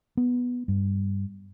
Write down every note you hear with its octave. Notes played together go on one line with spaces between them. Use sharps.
B3
G2